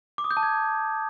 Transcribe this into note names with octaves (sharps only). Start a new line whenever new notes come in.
D6
D#6
G6
A5
G#6